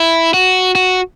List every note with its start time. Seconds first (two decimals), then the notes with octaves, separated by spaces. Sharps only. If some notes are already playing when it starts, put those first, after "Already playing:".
Already playing: E4
0.34 F#4
0.75 F#4